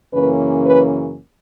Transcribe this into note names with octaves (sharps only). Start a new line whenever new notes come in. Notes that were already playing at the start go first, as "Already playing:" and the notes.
F#2 C#3 E3 A#3 C#4 B4
B4